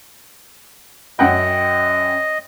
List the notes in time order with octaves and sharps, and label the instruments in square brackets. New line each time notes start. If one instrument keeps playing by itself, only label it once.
[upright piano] F#2 F#5 G5 [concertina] D#5